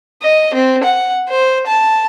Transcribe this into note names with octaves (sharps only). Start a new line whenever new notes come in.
D#5
C4
F#5
C5
A5